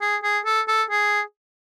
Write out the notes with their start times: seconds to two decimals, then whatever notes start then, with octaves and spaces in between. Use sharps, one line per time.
0.01 G#4
0.23 G#4
0.45 A4
0.68 A4
0.90 G#4